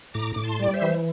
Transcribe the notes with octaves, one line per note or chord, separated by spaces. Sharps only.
A2 A#5 D6
A2 D6
A5 C6
G3 D5
C5 E5
E3